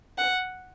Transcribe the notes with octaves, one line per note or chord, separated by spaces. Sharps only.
F#5